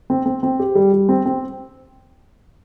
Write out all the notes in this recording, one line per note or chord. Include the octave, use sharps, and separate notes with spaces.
C4
C4
C4
G4
G3
G3
C4
C4